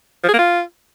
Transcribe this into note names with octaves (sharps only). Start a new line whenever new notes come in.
F3
G#4
A#3
F4